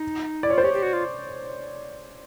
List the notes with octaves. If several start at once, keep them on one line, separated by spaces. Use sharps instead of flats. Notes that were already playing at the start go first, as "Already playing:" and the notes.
Already playing: D#4
E4 D5
C#5
F4 C5
G4 C#5
G4
F#4
F4